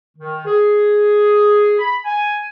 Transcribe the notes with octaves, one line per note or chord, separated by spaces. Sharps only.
D#3
G#4
B5
G#5